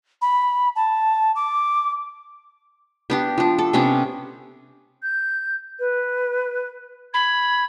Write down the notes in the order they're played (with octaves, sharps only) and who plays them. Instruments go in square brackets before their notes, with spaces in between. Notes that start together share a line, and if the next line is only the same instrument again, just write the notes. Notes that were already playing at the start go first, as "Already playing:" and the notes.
[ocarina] B5
A5
D6
[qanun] B3 D4 G4
F3 D4
A4
C3 B3 C#4 D4
[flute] G6
B4
[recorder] B5 [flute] G#6